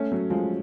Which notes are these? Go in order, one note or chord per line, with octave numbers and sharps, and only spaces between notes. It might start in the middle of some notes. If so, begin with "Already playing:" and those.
Already playing: A3 C#4
F#3 A3
F3 G#3